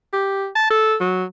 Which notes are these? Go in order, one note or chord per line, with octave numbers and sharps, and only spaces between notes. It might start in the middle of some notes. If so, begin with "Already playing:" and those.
G4
A5
A4
F#3